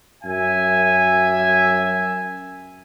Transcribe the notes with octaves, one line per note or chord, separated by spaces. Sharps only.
F#2 E5 G#5